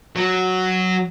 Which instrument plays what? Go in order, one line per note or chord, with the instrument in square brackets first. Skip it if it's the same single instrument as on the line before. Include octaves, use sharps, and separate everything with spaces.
[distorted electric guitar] F#3